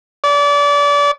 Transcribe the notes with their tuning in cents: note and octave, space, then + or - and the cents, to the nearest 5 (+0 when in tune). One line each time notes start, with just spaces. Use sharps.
D5 -30